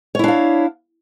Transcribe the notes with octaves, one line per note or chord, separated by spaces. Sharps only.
D4 E4 C#5 F5